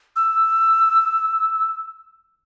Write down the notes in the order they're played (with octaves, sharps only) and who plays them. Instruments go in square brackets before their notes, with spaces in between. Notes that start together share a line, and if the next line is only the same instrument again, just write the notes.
[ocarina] E6